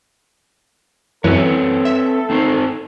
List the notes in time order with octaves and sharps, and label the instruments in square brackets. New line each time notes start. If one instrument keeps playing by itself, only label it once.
[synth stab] F#2 E3 [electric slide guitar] C4 B4 C#5 [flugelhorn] A4
[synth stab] E5
[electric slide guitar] C4 D#4 C5